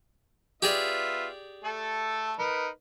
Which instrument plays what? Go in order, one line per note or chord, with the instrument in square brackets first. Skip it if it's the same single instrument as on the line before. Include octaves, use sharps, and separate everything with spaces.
[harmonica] B3 F4 E5 [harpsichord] G4 G#4 D5
[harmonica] A3 A4
D#4 A#4 B4